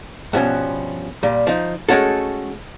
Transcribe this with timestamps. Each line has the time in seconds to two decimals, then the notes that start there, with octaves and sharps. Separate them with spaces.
0.33 G2 B2 F3 C#4
1.23 A#2 G3
1.47 F3 D#4
1.89 G#3 A3 C#4 F#4 A4